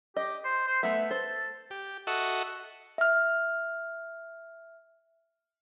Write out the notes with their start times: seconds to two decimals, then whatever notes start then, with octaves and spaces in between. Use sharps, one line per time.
0.16 G4 D#5
0.45 C5
0.68 C5
0.83 A3 B3 E5
1.11 A4 C5
1.71 G4
2.07 F#4 A4 D#5 E5 F#5 C#6
2.98 E5 F6